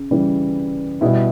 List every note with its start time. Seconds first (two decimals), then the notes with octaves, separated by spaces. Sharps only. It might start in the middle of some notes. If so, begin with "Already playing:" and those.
Already playing: C#3
0.11 C#3 E3 G3
1.01 B2 G3 E4